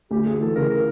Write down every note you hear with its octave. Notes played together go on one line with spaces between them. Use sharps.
D2 G4
D2 G#4
E3 A4
C#3 A#4
A#4